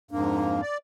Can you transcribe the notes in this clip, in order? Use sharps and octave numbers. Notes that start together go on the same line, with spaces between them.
F2 G#2 A#3 D4
D5